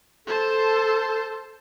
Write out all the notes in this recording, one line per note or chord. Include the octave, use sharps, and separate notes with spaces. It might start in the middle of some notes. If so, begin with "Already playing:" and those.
A4 C5 A5